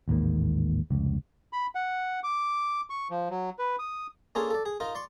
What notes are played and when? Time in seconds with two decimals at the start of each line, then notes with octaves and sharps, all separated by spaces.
0.08 A1 D#2 G#2 A#3
0.90 F1 C#2
1.53 B5
1.75 F#5
2.24 D6
2.90 C#6
3.10 F3
3.30 F#3
3.59 B4
3.79 D#6
4.35 A#3 C#4 D4 F4 G#4 A4
4.50 A4 D5
4.65 G#4
4.80 D#4 F4 A#4
4.95 D5 C6 C#6